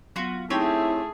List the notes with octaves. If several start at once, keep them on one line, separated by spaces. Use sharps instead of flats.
F#3 B3 F4 F#4
A3 C4 D#4 E4 G4 G#4 C#5